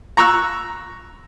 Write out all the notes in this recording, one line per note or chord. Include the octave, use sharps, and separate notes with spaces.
A#5 C#6 E6 F#6